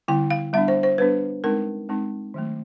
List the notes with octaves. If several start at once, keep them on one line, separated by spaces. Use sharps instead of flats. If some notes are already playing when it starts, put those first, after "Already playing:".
D3 G3 B3 E4 G5
F5
G3 B3 D4 E5
C5
C5
G3 B3 D4 B4
G#3 C4 D#4 A#4
G#3 C4 D#4
D#3 F#3 A3